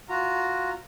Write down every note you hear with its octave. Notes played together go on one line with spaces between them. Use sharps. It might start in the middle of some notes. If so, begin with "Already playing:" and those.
F4 F#4 A#5